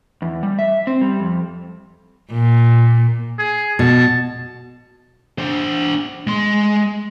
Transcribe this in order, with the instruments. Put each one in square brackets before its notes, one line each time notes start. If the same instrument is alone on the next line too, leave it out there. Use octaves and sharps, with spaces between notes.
[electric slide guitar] E2
G3
E5
C4
G3
F2
[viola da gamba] A#2
[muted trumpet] G#4
[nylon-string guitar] B2 [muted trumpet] A5
[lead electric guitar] D4 C5
G#3 C6